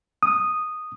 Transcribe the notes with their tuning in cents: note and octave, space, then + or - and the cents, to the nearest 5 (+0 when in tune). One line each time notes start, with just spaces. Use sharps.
D#6 -5